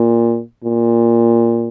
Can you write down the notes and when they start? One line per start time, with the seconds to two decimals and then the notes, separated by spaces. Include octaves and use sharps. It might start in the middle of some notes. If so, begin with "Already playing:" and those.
Already playing: A#2
0.64 A#2